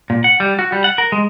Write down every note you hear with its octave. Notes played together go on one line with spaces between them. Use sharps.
A#2
F#5
G3
F#4
G3
F#5
A#4
G#3